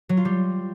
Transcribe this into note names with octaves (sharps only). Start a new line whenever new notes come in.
F#3
F4
G3